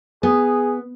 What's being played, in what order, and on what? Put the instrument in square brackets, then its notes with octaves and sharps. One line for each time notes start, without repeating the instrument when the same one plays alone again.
[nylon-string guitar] B3 [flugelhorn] G#4